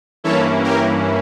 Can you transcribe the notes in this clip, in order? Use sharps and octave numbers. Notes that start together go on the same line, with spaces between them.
G2 E3 A#3 C#4 E4 A4 C#5
G4 A#4